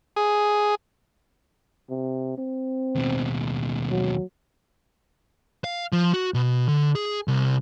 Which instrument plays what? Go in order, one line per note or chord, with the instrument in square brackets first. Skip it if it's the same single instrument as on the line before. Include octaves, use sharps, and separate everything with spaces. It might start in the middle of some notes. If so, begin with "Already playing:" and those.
[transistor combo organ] G#4
[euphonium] C3
C4
[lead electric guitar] D#2 B2
[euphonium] F#3
[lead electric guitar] F5
F3
F#4
B2
D3
G#4
C2